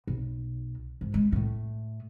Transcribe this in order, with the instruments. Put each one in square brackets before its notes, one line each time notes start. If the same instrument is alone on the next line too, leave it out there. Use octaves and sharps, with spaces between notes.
[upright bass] B1
G#1
G#3
A2 A3